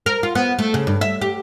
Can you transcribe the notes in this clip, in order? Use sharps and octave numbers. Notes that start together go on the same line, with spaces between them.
A#4
F4
B3
A3
C#3
G2
E5
G4